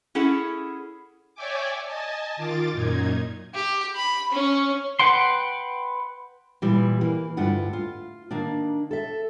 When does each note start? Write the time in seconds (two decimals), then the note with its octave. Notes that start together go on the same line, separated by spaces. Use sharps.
0.15 C#4 E4 G#4 A4 F#5
1.35 C#5 D5 E5 G5 G#5 D6
1.85 D#5 G#5 A5
2.37 D#3 F4 D6 A6
2.73 F#2 A#2 D#4 G#6
3.54 G4
3.95 B5
4.32 C#4
4.99 B4 F#5 G5 C6
6.62 A#2 E3 G3
7.01 E3 A#3
7.37 D2 G2 E4 F4 F#5
7.73 F4
8.31 D#3 A#3 D4
8.91 A4 E5